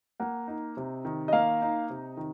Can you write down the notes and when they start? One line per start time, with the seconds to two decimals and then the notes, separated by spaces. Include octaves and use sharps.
0.20 A#3 F#5
0.48 D#4
0.77 C3
1.05 D#3
1.28 D#5
1.33 A#3 F5
1.62 D#4
1.90 C3
2.17 D#3